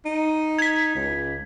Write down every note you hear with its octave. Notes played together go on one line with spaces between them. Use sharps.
D#4
G#6 B6
C#2